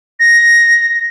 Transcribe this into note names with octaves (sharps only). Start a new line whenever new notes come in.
A#6